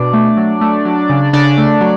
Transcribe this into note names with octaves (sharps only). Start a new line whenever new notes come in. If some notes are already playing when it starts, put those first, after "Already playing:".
Already playing: B2 D4 D5
A3
F#3
A3
F#3
C#3
C#3 D4 D5
A3
F#3